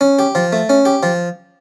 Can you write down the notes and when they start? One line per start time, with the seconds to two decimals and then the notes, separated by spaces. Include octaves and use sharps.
0.01 C#4
0.19 G4
0.35 F3
0.53 A3
0.69 C#4
0.85 G4
1.03 F3